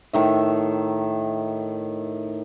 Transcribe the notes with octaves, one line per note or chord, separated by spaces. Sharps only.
A2 D#3 E5